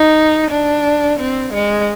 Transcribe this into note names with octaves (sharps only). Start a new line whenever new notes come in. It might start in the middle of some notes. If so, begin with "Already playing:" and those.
Already playing: D#4
D4
C4
G#3